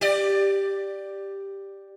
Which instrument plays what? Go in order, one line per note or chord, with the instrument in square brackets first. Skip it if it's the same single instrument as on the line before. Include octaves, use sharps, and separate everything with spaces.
[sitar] G4 D5